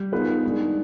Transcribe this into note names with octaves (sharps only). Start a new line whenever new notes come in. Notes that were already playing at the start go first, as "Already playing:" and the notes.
Already playing: G3
D#3 B3 F4 G#4 B4
D#3 G#3 D4 G#4